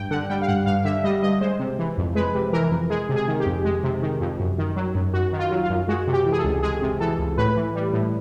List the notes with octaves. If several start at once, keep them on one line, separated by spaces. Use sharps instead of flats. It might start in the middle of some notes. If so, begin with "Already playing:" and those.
Already playing: G2 G5
D3 F#5
G3 G5
F5
G2 F#5
G2 F5
D3 E5
G3 D#5
G2 D#5
G#3 C5
C3
E3
F2
G#3 B4
C3
E3 A#4
F2
G#3 G#4
C3
G#4
D#3
G4
F2
G#3
C3
D#3
F2
F#2
D#3
F#3
F#2
F#2 F#4
D#3
F4
F#3
F4
F#2
G#3 F#4
C3
G4
E3
G#4
A4
C#2
G#3 G#4
C3
E3 A4
C#2
A2 B4
E3
G3
A2